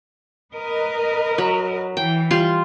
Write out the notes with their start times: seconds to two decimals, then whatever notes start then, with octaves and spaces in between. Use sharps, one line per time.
0.55 A#4 B4 D#5
1.38 F#3
1.97 E3 G5
2.31 G3 F4 C6